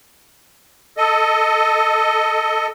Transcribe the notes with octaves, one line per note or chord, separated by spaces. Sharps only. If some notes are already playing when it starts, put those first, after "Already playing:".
A4 D#5